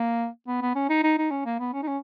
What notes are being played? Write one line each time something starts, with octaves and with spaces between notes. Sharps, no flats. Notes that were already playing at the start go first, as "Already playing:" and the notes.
Already playing: A#3
B3
B3
C#4
D#4
D#4
D#4
C#4
A#3
B3
C#4
D#4
C#4